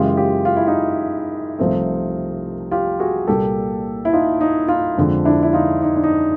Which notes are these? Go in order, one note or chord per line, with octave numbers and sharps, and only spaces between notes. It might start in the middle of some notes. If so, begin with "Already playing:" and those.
Already playing: F#2 C#3 E3 G#3 F4 G4
F4 G4
F4
E4
D#4 F4
C2 C3 F3 A3 C4
F4 G4
F#4 G#4
C2 A#2 G3 A#3 G4 A4
E4
D#4 F4
D#4
D#4 F4
F2 D3 F3 G#3
D4 E4
E4
D#4 F4
D#4
D4
D#4